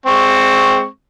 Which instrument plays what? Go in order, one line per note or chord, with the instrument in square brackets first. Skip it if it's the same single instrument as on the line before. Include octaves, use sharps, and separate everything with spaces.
[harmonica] G#3 C4 C#6